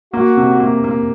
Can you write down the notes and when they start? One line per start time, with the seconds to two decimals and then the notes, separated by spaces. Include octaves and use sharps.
0.13 A#3 F#4
0.37 C3
0.60 A#3
0.84 A#3